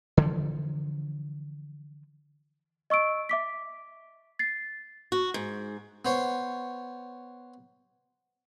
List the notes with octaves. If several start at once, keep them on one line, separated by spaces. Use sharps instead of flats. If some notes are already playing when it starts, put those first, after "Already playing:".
D3 E3 F3
D#5 C#6 E6 D7
E5 D6 B6
A6 C7
F#4
G#2
B3 C5 C#5